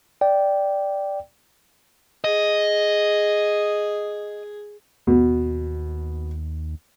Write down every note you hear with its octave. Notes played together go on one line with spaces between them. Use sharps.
D5 G5
G#4 D#5
D#2 B2